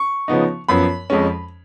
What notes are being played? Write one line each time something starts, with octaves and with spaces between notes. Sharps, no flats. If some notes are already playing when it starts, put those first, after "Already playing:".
Already playing: C#6
C#3 F3 B3 D#4
F#2 F3 B3 B5
F2 F3 G#3 C#4